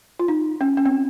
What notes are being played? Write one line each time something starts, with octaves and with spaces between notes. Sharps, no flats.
F4
D#4
C#4
C#4
C4